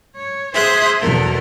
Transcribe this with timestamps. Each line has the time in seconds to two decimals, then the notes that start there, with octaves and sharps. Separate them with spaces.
0.16 C#5
0.54 G#4 C5 E5 C6 D#6 F#6
1.00 E2 B2 A4 A#4